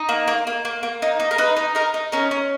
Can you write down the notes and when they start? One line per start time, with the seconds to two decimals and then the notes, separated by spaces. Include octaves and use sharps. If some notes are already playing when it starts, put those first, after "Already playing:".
Already playing: D#4
0.09 A#3
0.28 A#3
0.47 A#3
0.65 A#3
0.83 A#3
1.02 D#4
1.20 D#4
1.31 A#4
1.38 D#4 B4
1.56 D#4
1.75 D#4 A#4
1.94 D#4
2.12 C#4 A#4
2.31 C#4